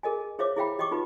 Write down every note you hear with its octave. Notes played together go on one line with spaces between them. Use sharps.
G#4 A#4 D#5 G#5
G#4 C5 C#5 E5 F5 D6
E4 G#4 E5 F5 G5 B5
G4 D#5 G5 C#6 D6
D#4 F4 G4 B4